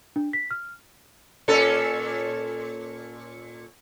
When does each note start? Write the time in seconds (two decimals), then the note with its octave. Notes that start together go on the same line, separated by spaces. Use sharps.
0.16 D4
0.33 B6
0.51 F6
1.48 A#2 C#4 A4